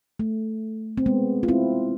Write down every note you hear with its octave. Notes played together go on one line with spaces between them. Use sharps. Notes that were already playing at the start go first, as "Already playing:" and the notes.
A3
C4
G#3 B3
F4
C4 E4